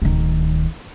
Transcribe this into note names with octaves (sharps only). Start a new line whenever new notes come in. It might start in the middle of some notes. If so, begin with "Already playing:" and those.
D1 D#3